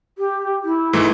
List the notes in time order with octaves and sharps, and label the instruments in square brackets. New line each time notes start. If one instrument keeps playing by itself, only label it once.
[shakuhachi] G4
E4
[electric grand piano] G#2 E3 A3